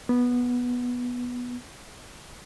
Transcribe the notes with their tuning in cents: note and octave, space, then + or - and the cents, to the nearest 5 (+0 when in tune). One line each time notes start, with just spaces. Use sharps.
B3 -10